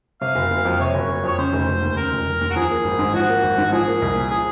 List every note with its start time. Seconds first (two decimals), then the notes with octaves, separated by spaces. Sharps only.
0.21 C3 F5
0.35 F#1
0.51 F#1
0.65 F2
0.80 C3 C#5
0.94 F#1
1.09 F#1
1.24 F2 C#5
1.38 C#3 C5
1.53 F1
1.68 F1
1.83 D#2
1.96 C#3 A#4
2.12 F1
2.26 F1
2.41 D#2
2.50 F#4
2.56 F3 G#4
2.71 A#3
2.84 G#1
2.99 G#2
3.14 F3 F#4
3.29 A#3
3.43 G#1
3.58 G#2
3.72 F3 G#4
3.87 A#3
4.02 C2
4.16 A#2
4.30 F3 G#4